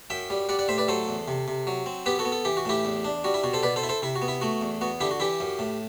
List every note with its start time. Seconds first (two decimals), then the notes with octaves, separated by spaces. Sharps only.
0.10 F#2 E5 G5
0.30 G3
0.49 G3 D5 F#5
0.59 D5 F#5
0.68 A2 C5 E5
0.78 B4 D5
0.88 F#3 A4 C5
1.08 E2
1.28 C3
1.48 C3
1.67 F#3
1.86 C4
2.06 B3 G4 B4
2.19 F#4 A4
2.25 B3
2.32 A4
2.45 E3 G4
2.57 F#4
2.65 A2 E4 G4
2.85 E2
3.05 D4
3.24 G3 F#4
3.34 E4
3.44 B2 F#4
3.53 A4 C5
3.63 B2 B4 D5
3.76 A4 C5
3.83 E4
3.89 A4 C5
4.02 C3 E4
4.16 F#4
4.22 B3
4.28 E4
4.41 A3 F#4
4.61 E2
4.81 B3 F#4
5.00 D3 E4 G4
5.11 F#4
5.20 E3 E4 G4
5.40 F#2
5.59 A2